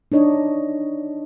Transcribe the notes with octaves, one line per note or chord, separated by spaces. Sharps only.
D4 D#4 C#5 D#5